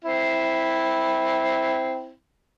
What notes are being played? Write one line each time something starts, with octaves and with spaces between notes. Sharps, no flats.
C4 E4